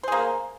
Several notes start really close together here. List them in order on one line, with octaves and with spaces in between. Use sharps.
C5 G#4 A#3